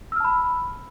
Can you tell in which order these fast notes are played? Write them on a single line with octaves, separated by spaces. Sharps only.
E6 F6 A5 B5